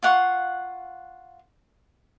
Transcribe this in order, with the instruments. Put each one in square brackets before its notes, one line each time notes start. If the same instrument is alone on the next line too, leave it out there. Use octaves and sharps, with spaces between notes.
[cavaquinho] F4 F5 F#5 C#6